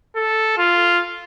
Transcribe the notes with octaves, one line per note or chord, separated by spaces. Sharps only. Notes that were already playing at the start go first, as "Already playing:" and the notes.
A4
F4